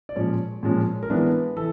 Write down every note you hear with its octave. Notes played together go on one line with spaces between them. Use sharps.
D5
A#2 F3 G#3 C#4 C#5
A#2 F3 G#3 C#4
A#4
E3 G#3 B3 D4 B4
E3 A4